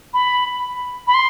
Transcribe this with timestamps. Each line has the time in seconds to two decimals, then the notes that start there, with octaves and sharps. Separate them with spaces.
0.14 B5
1.07 B5
1.14 C6